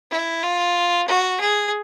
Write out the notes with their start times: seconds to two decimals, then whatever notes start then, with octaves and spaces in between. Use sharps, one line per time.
0.11 E4
0.43 F4
1.07 F#4
1.40 G#4